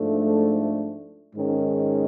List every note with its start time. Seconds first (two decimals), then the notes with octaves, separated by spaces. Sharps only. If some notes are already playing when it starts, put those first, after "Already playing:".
Already playing: G#2 F3 A3 D4
1.34 G#2 D#3 G#3 C#4